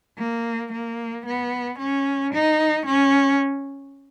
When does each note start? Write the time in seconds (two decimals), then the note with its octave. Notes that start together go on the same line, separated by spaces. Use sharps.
0.19 A#3
0.73 A#3
1.26 B3
1.79 C#4
2.34 D#4
2.86 C#4